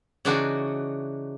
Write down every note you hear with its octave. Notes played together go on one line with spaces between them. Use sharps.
C#3 E3 D4 D#4 F#4